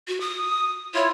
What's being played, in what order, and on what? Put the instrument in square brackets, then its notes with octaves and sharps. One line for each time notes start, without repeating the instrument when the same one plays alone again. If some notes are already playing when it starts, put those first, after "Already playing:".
[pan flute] F#4
D#6
[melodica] E4 F4 [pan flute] C#5